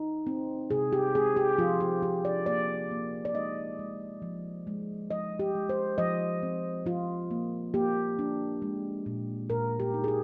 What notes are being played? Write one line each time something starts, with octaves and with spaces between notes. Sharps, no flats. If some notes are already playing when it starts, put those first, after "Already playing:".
Already playing: D#4
C4
C3 G#4
G4
C4 G#4
G4
F3 F4
G4
F3 G4
D5
A#3 D5
A#3
D5
G#3 D#5
G#3
F3
G#3
F3 D#5
G4
G#3
C5
F3 D#5
C4
F3 F4
A#3
A#3 G4
D4
G#3
A#2
A#2 A#4
G4
D#4
G#4
G4